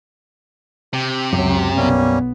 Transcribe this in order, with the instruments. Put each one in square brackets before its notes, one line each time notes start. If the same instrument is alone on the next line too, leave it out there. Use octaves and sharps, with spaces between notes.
[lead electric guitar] C3 [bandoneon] G4
[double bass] C#2 F#3 [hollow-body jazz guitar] F#2
[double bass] B1 B3 [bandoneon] G3 A#3 C#4